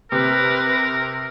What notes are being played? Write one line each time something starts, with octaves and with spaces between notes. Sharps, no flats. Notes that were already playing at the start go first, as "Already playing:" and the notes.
C3 A#4 B4